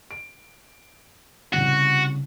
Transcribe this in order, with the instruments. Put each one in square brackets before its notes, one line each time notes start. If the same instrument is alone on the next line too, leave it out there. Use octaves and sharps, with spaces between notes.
[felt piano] D7
[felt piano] C2 C#3 [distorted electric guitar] F#4